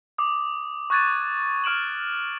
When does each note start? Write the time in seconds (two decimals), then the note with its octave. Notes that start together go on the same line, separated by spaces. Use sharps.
0.18 D6 D#6
0.90 C#6 F#6 G#6 A6 D#7
1.64 C#6 F6 D7 E7 F#7